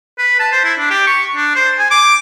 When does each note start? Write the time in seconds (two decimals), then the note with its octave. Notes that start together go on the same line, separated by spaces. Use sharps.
0.18 B4
0.40 A5
0.52 C5
0.64 E4
0.79 D4
0.90 G4
1.07 C#6
1.35 D4
1.56 C5
1.79 G#5
1.91 D6